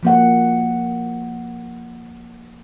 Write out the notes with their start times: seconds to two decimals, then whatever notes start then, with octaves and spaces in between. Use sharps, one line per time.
0.03 F3 A#3 F#5